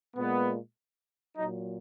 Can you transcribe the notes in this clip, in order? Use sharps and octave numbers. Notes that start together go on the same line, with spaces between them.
A#2 G#3 B3
A#2 F#3 D#4